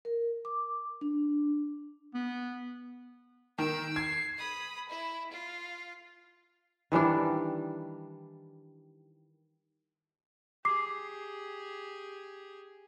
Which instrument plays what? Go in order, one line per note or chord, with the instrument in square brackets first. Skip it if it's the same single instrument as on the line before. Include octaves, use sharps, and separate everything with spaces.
[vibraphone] A#4
D6
D4
[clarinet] B3
[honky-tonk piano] D#3 [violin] E6 D7
[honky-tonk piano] G#6 [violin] C7
[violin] B5 D#6
E4
F4
[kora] D#3 E3 G3 D4
[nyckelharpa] G4 G#4 [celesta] D6 C7